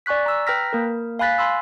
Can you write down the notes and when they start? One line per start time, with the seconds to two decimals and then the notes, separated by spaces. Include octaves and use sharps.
0.06 D5 G#5 C#6 F#6 B6
0.26 A#5 E6
0.47 B4 G5 A#5 F6 A#6 B6
0.73 A#3 A#4
1.19 F5 G#5 B5 F#6 A6 B6
1.38 G#5 B5 C6 E6